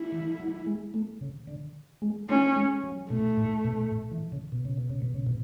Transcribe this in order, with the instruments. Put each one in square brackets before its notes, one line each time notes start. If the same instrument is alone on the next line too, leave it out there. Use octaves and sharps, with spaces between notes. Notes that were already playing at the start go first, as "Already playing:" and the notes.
Already playing: [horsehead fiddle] E4
[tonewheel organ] E3
F#3
G#3
A3
C#3
D3
G#3
[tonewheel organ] A3 [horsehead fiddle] C#4
[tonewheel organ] G#3
F#3
[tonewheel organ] B2 [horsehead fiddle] A3
[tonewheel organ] A2
B2
A2
E3
C#3
B2
C#3
B2
C#3
B2
C#3
B2